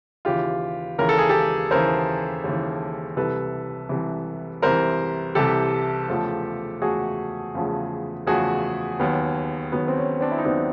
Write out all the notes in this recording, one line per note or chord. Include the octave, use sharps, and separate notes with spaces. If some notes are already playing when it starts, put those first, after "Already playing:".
D#2 C#3 E3 F4 G4
D#2 C#3 E3 A#4
A4
G#4
G4 A4
D#2 C#3 E3 A#4 C5
D#2 C#3 E3
C2 C3 E3 A4 B4
C2 C3 E3
C2 C3 E3 A#4 C5
C2 C3 E3 G4 A4
E2 C#3 F3 A3
E2 C#3 F3 A3 F#4 G#4
E2 C#3 F3 A3
E2 C#3 F3 A3 F#4 G#4
D#2 D#3 F#3 B3
D#2 D#3 F#3 B3
C4
C#4
C4 D4
E4
D#4
D#2 D#3 F#3 B3 C4 D4